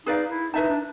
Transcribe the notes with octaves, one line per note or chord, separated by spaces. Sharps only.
D#4 G#4 B4 D5 F5
E4
D#4 B4 E5 A5
D4